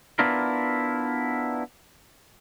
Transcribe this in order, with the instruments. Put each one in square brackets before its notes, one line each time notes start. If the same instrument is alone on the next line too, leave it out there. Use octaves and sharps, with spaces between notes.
[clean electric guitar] B3 D4 E4 F4 A#4